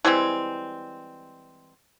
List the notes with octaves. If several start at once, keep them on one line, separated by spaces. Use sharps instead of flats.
E3 G3 G#3 C4